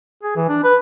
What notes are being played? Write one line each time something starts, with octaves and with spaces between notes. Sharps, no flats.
G#4
E3
D4
B4